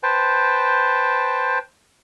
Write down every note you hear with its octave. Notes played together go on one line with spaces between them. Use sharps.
B4 C5 G5 A5